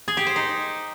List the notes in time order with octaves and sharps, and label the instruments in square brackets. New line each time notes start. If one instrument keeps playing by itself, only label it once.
[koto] G#4
G4
C5
D#4